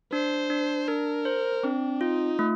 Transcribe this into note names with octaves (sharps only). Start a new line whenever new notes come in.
D4 C5
D4
D4 A#4
C5
C4 D4
D#4 F4
A3